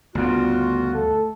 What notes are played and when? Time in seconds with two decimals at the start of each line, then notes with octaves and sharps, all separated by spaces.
0.15 D2 G2 C#3 B3 F4 F#4
0.94 A3 A4